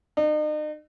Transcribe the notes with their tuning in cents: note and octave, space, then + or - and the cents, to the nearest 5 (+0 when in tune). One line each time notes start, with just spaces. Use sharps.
D#4 -40